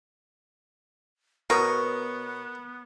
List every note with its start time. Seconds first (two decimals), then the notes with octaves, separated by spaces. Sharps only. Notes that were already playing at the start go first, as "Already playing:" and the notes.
1.50 B2 B3 A#4 C#5 D#6